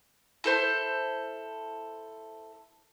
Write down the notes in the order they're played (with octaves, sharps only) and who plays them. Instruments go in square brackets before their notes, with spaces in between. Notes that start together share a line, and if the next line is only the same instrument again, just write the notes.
[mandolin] E4 A4 C5